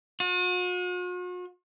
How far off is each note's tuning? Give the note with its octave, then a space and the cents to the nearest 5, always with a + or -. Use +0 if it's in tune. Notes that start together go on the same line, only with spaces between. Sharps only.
F#4 -45